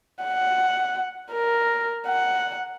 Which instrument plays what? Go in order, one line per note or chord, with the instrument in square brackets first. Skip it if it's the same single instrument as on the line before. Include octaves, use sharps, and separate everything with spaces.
[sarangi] F#5
A#4
F#5